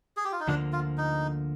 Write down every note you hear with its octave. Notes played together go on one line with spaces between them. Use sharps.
G#4
G4
F4
D#4
D2 D3 F3 A#3 D4
F4
D#4